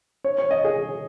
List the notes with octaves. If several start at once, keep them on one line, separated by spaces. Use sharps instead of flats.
C#5
C#5
D#5
G#4